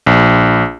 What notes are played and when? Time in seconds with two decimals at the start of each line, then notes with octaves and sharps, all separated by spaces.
0.06 A#1